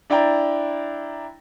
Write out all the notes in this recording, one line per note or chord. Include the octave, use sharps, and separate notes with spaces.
D4 E4 D5 G5 A#5